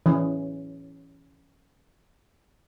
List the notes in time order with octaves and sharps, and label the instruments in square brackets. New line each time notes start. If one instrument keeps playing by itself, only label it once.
[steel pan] E3 C#4